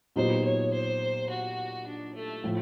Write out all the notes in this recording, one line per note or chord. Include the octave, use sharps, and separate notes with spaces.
A#2 F#3 B3 D#4 G4 C5
C#5
C5
F#4
D4
A3
A2 F3